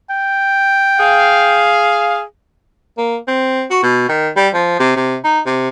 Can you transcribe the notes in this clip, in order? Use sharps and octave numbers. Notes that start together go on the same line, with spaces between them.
G5
G#4 F5
A#3
C4
F#4
B2
D#3
G3
F3
C3
C3
D#4
C3